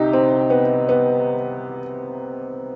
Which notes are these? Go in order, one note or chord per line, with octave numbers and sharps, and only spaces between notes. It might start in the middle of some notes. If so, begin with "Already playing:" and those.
Already playing: C2 C3 D#4 G4
C4
B3
B3